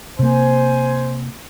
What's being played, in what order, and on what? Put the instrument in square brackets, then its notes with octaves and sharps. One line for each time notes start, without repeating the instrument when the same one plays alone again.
[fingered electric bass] C3 A#3 [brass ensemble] C5 G#5